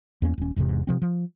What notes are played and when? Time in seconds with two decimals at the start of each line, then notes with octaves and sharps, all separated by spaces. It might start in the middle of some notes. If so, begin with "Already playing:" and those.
0.22 E2 A#3 C#4
0.38 D#1 C#4
0.56 E1 E2 G#2 C3
0.87 C3 F3 C4
1.02 F3